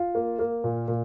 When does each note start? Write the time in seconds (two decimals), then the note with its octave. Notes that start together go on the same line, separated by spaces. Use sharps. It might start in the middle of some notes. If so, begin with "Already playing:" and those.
Already playing: F4
0.15 A#3
0.39 A#3
0.64 A#2
0.88 A#2